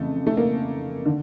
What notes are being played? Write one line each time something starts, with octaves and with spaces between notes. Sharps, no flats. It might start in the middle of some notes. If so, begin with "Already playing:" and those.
Already playing: F2 C#3 E3 A3
A3
A#3
D3